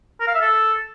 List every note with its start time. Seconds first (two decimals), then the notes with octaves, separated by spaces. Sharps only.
0.20 A#4
0.28 F5
0.35 E5
0.42 A4